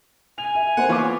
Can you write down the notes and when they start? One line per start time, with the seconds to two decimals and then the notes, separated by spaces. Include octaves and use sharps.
0.38 G#5 F7
0.55 E5
0.77 A#3 C5 F#5
0.89 E3 B3 F4 C#5 F5 G#5 D6